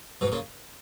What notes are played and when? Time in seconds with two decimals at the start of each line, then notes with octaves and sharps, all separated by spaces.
0.21 G#2 B2
0.32 A#2 C#3